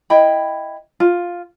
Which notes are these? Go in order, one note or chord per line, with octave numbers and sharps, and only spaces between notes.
E4 D#5 G5 B5
F4